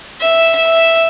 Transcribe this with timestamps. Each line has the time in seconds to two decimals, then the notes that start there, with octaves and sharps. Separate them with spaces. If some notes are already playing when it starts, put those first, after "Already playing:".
0.21 E5
0.55 E5